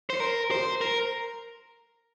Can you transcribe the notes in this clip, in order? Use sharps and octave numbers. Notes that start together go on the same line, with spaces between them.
C5
A#4
C5
A#4